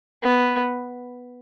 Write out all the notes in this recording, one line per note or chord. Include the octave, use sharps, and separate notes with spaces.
B3